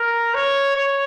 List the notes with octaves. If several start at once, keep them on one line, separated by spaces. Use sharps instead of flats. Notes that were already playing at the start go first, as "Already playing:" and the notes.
Already playing: A#4
C#5
C#5